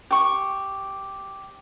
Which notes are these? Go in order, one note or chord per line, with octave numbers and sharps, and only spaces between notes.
G4 C#6